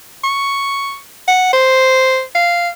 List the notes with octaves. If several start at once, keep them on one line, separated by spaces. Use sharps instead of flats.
C#6
F#5
C5
F5